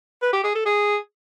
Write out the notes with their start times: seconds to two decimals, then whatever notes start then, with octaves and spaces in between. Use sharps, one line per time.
0.22 B4
0.33 G4
0.44 G#4
0.55 A4
0.66 G#4